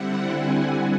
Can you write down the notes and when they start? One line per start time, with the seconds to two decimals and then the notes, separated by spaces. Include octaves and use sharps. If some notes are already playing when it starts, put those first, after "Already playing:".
Already playing: D3 G3 C4 E4 F#5
0.30 G#5